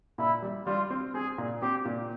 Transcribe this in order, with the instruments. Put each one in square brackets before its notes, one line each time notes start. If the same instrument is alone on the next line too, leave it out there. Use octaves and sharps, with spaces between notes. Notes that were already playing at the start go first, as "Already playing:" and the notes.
[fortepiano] A#2 [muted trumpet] E4
[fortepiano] G3
[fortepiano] G3 [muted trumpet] F4
[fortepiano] C4
[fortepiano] C4 [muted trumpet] G#4
[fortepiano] A#2
[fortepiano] C4 [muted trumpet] G4
[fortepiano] A#2